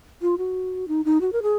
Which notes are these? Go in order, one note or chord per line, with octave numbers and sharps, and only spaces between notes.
F4
F#4
D#4
D#4
F#4
A#4
G#4